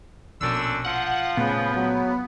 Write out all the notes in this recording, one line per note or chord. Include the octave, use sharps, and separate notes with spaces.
A#1 F#2 B2 D3 D4 E6
F3 F#5
A#2 C#3 A3 B3
F#3